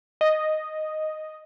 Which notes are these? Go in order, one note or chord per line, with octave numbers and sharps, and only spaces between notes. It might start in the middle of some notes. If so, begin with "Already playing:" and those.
D#5